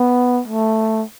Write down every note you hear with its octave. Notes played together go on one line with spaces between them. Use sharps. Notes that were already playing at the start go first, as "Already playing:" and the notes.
Already playing: B3
A3